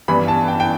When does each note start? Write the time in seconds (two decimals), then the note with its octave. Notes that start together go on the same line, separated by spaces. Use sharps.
0.08 G2 E3 B3 D4 B5
0.28 A5
0.48 G5
0.60 G5